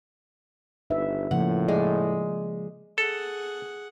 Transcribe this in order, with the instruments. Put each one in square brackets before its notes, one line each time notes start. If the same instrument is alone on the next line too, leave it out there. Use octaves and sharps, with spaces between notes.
[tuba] G1 [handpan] D#4 B4 E5
[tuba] A2 [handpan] C#3 F3 A#3 [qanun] F#5
[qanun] G#3 [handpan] D5
[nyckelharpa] G#4 F#5 [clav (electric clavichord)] A4